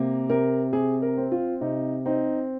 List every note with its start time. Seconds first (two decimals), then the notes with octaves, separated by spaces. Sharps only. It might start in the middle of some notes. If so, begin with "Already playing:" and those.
Already playing: C3 A#3
0.29 C3 A#4
0.72 C3 G#4
1.02 A#4
1.17 C4
1.32 F4
1.61 C3 D#4
2.06 C4 D#4